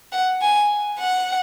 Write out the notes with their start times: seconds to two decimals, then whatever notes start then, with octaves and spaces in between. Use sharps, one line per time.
0.12 F#5
0.41 G#5
1.00 F#5